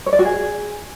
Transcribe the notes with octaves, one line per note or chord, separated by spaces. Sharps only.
C#5
D5
F#4
G#4